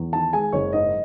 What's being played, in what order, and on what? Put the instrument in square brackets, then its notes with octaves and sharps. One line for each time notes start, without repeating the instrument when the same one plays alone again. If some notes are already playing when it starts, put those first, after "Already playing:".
Already playing: [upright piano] E2
D#3 A5
G#3 G#5
F#1 C#5
G#2 D#5